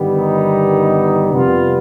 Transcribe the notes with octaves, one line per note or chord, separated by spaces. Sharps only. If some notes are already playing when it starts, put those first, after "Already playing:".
Already playing: G1 G2 D#3 G3 B3
D#4
F2 C3 G3 B3 F4